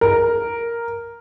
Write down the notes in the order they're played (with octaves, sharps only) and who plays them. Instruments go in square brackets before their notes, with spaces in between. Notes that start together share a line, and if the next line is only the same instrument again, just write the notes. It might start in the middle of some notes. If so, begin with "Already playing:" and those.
[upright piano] A#4